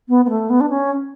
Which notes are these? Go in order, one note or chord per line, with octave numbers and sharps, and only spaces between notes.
B3
B3
A3
B3
D4
C#4